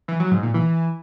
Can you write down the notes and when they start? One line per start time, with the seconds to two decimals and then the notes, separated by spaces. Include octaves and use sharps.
0.08 E3
0.20 F#3
0.31 G#2
0.43 A#2
0.54 E3